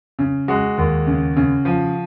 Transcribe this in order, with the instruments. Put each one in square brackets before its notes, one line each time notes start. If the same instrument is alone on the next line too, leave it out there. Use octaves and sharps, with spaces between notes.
[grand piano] C#3
G#3 F#4
D#2
C#3
C#3
F3